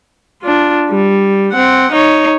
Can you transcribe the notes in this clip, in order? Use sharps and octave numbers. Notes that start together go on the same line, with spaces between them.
D4 F4
G3
C4 F#5
D#4 C#5